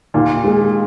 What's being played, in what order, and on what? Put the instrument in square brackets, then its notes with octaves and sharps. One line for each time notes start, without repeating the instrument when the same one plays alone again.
[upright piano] D#2 [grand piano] A#2
[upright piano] G#3